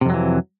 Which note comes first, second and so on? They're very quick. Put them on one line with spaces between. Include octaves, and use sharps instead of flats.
C3 F2 F#3 E3